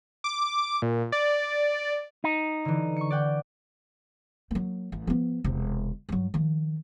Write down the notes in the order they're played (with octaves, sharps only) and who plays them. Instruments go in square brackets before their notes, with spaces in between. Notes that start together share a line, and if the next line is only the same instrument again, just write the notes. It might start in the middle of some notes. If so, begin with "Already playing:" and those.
[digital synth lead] D6
A#2
D5
[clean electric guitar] D#4
[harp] D3 E3
C#6 C#7
D5 F#5 G5
[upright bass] F#3 A#3
A1
F3 B3
E1 C3
G2 F#3
D#3 F3